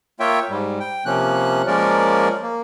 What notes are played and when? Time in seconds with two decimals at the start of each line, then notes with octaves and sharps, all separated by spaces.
0.20 A#3 F4 C#5 E5 G5
0.50 G#2 G3
0.80 G5
1.05 C3 F3 A#3 C#4 F#6
1.67 F3 G#3 A#3 C#4 A#4 D5
2.42 A#3